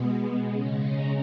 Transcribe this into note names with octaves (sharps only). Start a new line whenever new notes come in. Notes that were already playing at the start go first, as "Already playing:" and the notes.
Already playing: B2 G#3 B3
C#3 G#3 C#4
A#5